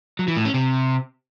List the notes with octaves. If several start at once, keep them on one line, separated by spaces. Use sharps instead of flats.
F#3
E3
A2
C#4
C3